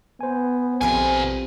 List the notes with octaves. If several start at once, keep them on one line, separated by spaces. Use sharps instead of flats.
B3 C5 G#5
A#1 F2 B2 F3 G3 G#5